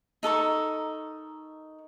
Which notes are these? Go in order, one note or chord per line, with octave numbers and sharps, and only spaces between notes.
D#4 A4 A#4 C#6